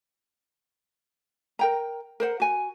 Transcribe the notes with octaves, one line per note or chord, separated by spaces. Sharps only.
A#4 G5 A#5
A#4 C5 F#5
F#4 G#5